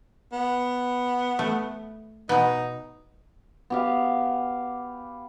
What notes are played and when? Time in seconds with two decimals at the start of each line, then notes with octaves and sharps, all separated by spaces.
0.32 B3
1.39 A3
2.29 B2 B3 D#4
3.70 B3 G4 F5